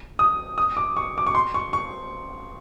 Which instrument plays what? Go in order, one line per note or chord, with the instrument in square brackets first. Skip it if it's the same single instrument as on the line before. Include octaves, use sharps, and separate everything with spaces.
[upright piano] D#6
D#6
D6
C#6
D6
C#6
C6
C#6
C#6